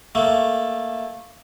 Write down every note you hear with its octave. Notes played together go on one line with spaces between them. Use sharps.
A3 A#3